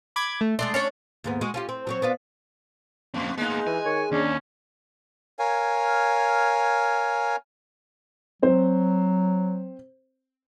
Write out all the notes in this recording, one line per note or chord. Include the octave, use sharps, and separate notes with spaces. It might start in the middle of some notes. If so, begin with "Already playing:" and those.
B5 D6 G#6
A3
G#3 A3 D4 C6
C#4 D4 C#5
D#2 G#2 B3
G#3 F#4
C#4 F4 G4
C4
F#3 C4 C#5
B3 D4 F4
F2 A#3 C4
G#3 A#3 B3 D#4
E3 G#5
D#3 C#5
D#2 C#4 D4
A#4 C#5 F5 G#5
F#3 C4 C5